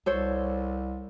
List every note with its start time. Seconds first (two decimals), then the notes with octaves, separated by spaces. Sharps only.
0.06 C2 A4 C5 C#5